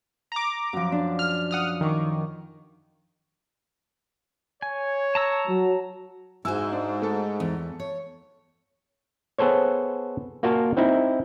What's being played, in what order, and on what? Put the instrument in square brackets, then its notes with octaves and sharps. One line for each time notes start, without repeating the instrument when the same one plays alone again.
[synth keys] A#5 D6
[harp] F#2 F3
D4
[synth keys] F6
F#5 D#6 F6
[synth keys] D#3 [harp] G#5 C#6 D6
[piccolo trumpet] C#5 [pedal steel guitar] G#5
[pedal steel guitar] A5 A#5 E6
[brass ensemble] F#3
[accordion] G#2 [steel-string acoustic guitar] E4 F#4 C5 [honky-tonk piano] G#5 E6
[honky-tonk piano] D4
A3 A4
[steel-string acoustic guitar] E2
C#5
[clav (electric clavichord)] B3 G#4 A4 C5 C#5
A#3 F4 F#4 A#4 F5 A5
C4 D#4 E4